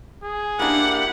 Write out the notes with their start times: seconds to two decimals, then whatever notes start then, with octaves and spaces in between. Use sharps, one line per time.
0.23 G#4
0.59 A#3 D4 E4 G4 F#5